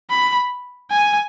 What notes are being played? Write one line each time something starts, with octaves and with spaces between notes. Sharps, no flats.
B5
G#5